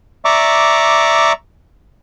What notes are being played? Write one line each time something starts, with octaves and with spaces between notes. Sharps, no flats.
D5 E5 A#5 C#6 D6